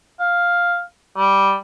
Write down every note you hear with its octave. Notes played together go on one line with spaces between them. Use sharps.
F5
G3